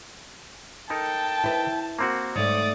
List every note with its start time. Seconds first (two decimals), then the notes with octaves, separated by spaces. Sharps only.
0.90 D#4 A4 A#4 G5 A5
1.44 E4 B4
1.99 A#3 C4 F#4
2.36 G#2 A3 C#5 D5 D#6